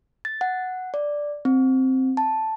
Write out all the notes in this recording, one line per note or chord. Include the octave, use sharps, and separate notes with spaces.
A6
F#5
D5
C4
A5